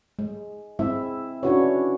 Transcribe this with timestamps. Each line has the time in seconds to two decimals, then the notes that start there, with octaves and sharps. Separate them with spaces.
0.19 G#3
0.79 G#3 C4 E4 E5
1.43 C#4 D4 E4 F#4 B4 C#5